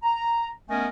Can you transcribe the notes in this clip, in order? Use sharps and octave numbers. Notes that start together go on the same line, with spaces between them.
A#5
A3 B3 C#4 A#4 D#5 G#5